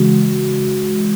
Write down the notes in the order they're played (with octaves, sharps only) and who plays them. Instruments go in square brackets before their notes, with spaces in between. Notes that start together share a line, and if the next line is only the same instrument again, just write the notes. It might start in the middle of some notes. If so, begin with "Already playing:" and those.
Already playing: [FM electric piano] C#3 E3 G#3 F#4